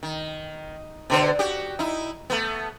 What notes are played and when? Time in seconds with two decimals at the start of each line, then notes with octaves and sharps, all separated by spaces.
0.03 D#3
1.10 B2 D3 C5
1.39 F#4 G4
1.79 D#4 E4
2.30 A3 B3